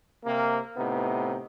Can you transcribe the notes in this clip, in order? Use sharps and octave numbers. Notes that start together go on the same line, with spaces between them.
C3 A#3
A2 C3 B3 D#4